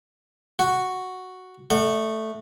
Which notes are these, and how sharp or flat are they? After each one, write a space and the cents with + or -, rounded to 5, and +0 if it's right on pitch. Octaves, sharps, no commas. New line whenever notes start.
F#4 +0 F#5 +0
A3 +0 D5 +45 F#5 -10